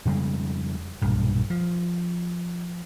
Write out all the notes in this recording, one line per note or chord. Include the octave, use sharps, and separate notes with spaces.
F2 C#3 G3 G#3
B1 G2 A#2
F3